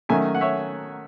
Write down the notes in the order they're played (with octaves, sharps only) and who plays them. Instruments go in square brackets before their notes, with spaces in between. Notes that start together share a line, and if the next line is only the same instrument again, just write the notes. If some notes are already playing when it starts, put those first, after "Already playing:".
[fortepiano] D#3 F#3 A3 C#4 E5 G#5
F#5
C#5 E5